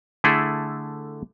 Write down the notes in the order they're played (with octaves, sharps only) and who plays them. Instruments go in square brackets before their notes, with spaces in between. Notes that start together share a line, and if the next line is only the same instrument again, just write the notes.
[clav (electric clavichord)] D3 A3 E4 G#4 A4